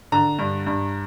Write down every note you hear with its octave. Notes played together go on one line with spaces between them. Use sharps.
D3 A#5
G2
G2